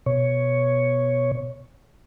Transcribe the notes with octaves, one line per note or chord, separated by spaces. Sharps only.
B2 C#5